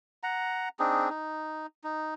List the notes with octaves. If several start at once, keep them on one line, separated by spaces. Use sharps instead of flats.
F#5 A#5
C4 D4 D#4 G#4
D#4
D#4